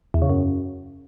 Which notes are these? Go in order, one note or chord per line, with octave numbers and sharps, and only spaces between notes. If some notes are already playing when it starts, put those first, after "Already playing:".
E2
C#3
F#2